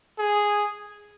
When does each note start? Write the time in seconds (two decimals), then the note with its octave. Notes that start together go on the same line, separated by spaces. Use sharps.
0.19 G#4